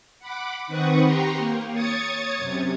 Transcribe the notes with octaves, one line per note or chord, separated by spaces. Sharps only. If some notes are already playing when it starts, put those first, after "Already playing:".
F#5 B5 D6
D#3 C4 B4 F#5 C#6 D#6
G4 G5 A#5 C6 C#6
A#3
C#5 D#6 G#6 A6 C#7
F#2 C3